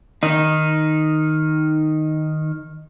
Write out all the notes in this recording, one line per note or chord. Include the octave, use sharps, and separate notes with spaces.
D#3 D#4